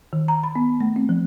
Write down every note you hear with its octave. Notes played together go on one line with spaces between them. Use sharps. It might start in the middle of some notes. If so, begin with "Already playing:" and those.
D#3
A#5
B5
B3
A3
C4
F3